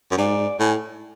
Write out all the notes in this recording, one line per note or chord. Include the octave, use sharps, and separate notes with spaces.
F#2
G#2 D5
A2 G#5